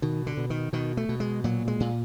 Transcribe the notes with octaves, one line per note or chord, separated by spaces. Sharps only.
B2 D#3
D3
B2
D#3
B2 D#3
A3
B2
G#3
A#2 F#3
G#3
A#2